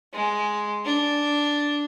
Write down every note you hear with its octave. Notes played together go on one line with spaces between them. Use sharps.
G#3
D4